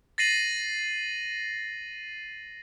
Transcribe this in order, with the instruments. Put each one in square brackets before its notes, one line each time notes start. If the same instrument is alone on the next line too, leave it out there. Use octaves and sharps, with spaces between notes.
[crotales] A6 A#6 C7 D#7 F#7